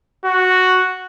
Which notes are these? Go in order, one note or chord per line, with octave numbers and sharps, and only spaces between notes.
F#4